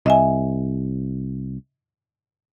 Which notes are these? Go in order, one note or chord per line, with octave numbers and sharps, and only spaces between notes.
C2 D#5 E5 G#5